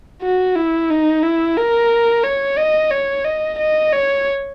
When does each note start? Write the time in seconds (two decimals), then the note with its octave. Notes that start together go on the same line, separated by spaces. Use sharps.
0.22 F#4
0.56 E4
0.90 D#4
1.23 E4
1.57 A#4
2.24 C#5
2.58 D#5
2.91 C#5
3.25 D#5
3.59 D#5
3.93 C#5